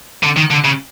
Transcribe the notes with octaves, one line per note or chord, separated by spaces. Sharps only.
D3
D#3
D3
C#3